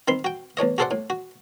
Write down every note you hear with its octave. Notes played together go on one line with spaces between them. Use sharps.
D#3 C4 B5 C6
F#4 G5
E2 A2 C#5 D#5
F#4 G#4 A4 C5 D5 F#5
A2
F#4